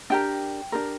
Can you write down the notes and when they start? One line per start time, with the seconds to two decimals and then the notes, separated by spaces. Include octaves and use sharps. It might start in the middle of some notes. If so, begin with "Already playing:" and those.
0.10 D4 G4 A#4 G5
0.72 D4 G4 A#4